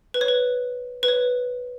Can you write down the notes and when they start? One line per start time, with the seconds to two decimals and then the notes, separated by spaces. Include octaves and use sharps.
0.14 B4
0.21 C#5
0.28 B4
1.03 B4
1.08 C#5